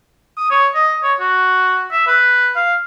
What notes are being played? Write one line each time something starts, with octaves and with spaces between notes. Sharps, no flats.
D#6
C#5
D#5
C#5
F#4
E5
B4
F5